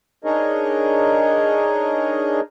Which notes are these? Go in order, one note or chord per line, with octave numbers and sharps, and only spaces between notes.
D4 D#4 G#4 A#4 C#5 D#5